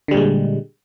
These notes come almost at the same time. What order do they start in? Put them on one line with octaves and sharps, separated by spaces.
D3 G3 A#2 G#3